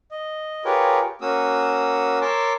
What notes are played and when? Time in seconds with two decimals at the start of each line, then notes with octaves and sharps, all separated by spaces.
0.11 D#5
0.65 F4 G4 G#4 A#4 B4 C#5
1.21 A#3 C#4 F#4 D#6 E6
2.21 A#4 C#5 A5 C6 D6 E6